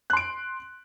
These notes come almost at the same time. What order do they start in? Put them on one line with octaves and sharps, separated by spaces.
F#6 C6 D7